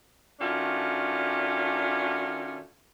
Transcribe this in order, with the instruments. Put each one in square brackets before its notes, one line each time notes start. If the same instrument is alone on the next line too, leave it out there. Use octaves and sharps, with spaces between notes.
[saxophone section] D#3 A3 C#4 D4 F4 F#4